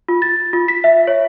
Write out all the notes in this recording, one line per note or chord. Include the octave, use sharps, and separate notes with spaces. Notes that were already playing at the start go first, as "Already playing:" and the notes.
F4
A6
F4
B6
E5
C#5